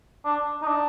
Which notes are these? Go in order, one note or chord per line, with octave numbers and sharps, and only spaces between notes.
D4
D#4
D4